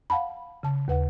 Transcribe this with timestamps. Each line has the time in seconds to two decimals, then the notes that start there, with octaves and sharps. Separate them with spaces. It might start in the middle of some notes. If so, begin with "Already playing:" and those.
0.10 F5 F#5 A5 B5
0.63 C#3 A5
0.88 D#2 B4 F#5